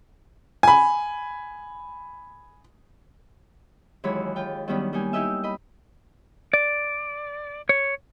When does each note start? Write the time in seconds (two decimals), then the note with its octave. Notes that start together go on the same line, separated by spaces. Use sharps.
0.63 G#5 B5
4.04 D#2 E3 F#3 G#3 C#5 B5
4.36 F4 G5
4.68 D#3 F#3 G3 B3 C#4 D4
4.93 G3 A#3 D#4 G#5
5.13 D#4 E4 G4 D#5 E5
5.44 D#5 B5
6.53 D5
7.69 C#5